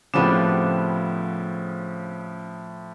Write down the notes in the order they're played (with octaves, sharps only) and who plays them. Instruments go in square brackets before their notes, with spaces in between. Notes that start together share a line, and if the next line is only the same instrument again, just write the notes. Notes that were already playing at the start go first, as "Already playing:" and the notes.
[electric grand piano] A2 F3 E7 [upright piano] C#3 C4 [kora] B3 D4 G4